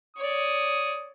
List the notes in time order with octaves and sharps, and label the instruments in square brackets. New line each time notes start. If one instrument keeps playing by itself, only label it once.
[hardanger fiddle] C#5 D5 [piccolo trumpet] D#6